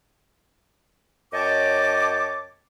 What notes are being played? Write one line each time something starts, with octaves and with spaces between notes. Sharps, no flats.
F#2 C#5 D#5 G5 A5 D6